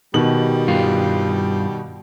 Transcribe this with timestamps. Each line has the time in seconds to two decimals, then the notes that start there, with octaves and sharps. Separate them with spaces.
0.14 B2 D#3 G3 F#7
0.68 G2 F4